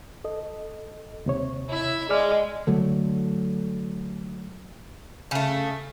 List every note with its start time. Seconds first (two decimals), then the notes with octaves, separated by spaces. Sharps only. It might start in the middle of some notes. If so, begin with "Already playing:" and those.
0.24 A4 D#5
1.26 D#2 C3 C#5
1.69 E4 E5
2.09 G#3 G#4 D5 F6
2.67 D3 F#3 A3
5.31 C#3 A3